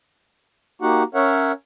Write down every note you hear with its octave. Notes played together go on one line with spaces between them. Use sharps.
A#3 D#4 F#4 G4 F#5
C#4 A#4 C#5 E5 F#5